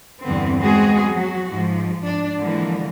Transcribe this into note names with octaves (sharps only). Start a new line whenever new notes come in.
E2 G2 D3 B3 C4
G#3 B3 C4 F#4 G#4
F#3 F#4
G#2 F3
D4
D3 E3 F3 G#3 A#3